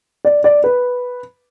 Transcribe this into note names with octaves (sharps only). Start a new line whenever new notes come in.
D5
D5
B4